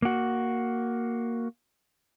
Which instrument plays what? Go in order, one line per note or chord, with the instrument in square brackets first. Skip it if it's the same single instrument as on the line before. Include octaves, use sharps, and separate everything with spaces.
[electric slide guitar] A#3 F#4